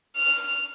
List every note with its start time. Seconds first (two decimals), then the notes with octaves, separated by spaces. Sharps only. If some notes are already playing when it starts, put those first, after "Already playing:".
0.16 F6